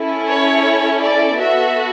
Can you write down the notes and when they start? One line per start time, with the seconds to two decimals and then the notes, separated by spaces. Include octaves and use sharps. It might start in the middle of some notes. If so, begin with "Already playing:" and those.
Already playing: C#4 E4 A4
0.29 C#5
1.01 D5
1.37 B3 F#4 A4 E5